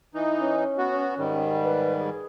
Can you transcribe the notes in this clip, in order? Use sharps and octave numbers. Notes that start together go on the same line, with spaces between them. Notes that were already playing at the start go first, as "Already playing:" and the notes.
E3 D#4
C#4
B3 F#4
G#2 D#3 G3
B4
G#4